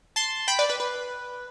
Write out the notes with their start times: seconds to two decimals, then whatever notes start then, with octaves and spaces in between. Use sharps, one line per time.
0.16 A5 C6
0.48 G5 B5
0.59 B4 D5
0.70 B4
0.80 B4